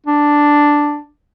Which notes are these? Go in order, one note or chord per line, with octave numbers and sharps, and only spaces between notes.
D4